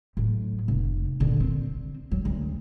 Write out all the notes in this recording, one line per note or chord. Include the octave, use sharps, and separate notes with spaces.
A2 F#3
F1
A#2 D3
C4
F#3
D2